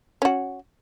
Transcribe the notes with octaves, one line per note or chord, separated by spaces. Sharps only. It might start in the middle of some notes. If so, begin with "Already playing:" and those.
C#4 F#4